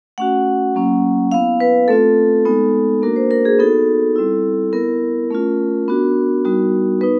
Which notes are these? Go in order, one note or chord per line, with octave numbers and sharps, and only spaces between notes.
A3 C#4 F#4 F#5
F#3 A#3 C#4
B3 E4 F5
B4
A3 C4 F4 A4
G#3 B3 D#4
A#3 D4 F#4 A#4
C5
A#4
G#4
B3 D#4 F#4 A4
G3 C4 E4
B3 E4 A#4
A3 C#4 F4
B3 D4 F#4
G3 B3 D#4 F#4
B3 D#4 B4